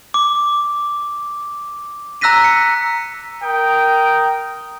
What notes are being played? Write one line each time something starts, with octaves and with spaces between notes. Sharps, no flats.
D6
A#5 E6 F#6 A#6 B6 D#7
C#7
A#4 G5 D#6